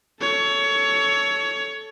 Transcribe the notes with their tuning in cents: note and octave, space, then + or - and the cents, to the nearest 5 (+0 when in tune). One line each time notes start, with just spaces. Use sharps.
A4 +0 C#5 +20